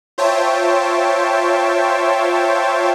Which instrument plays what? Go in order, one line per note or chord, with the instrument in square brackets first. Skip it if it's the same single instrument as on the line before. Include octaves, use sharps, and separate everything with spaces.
[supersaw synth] F4 C5 C#5 E5 G5 A5